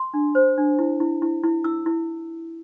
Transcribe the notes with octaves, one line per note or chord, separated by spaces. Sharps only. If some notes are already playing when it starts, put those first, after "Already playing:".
Already playing: C6
D4
C5
D4
E4
E4
E4
E4
E4 E6
E4